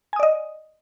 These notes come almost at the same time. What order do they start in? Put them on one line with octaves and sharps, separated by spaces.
G#5 D#6 D5 D#5